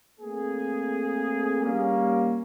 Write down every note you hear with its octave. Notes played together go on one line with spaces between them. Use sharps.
A3 A#3 C4 G#4
G3 A#3 C#4